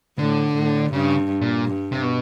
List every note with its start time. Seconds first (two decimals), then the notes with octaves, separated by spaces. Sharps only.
0.19 A2 D3
0.56 A2
0.93 G2 C#3
1.41 A#2
1.66 G2
1.92 C3
2.02 B2